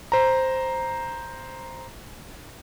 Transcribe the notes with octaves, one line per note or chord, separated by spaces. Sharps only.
C5 A#5